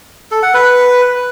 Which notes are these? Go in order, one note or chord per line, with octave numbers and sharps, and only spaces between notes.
A4
F#5
B4